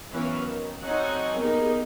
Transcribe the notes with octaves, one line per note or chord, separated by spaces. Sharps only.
E3 F#3 B3 C#4 B4 F5
D#3
F#3 C4 D#4 A4 F#5 G#5
A#3 B3 D#4 G4 G#4 A#4